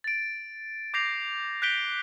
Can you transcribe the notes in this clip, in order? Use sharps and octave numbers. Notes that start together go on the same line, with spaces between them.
A6 D7
D6 G6 A#6 C7 F7
F#6 G6 B6 D7 G7